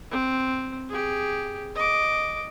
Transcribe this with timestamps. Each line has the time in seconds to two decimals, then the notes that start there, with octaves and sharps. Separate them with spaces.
0.11 C4
0.89 G4 G#4
1.76 D#5 D6